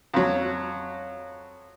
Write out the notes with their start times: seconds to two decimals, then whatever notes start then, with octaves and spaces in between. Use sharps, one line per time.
0.14 F2 F#3